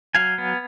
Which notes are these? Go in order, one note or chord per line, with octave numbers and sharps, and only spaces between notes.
F#3 F5 G#5
B3